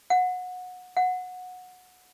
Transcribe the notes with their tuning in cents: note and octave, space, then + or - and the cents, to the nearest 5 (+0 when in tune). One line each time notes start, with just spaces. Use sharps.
F#5 -20
F#5 -15